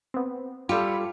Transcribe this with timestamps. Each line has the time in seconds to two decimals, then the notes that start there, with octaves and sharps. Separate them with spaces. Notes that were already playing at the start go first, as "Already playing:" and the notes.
0.14 B3 C4
0.69 G3 F4 G4 A4 B5 G#6 C#7